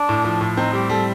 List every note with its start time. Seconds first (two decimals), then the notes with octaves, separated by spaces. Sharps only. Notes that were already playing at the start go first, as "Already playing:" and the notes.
Already playing: D4
0.09 A2
0.24 F3
0.41 A2
0.57 C4 D#4
0.73 G3 G4
0.90 G3 A4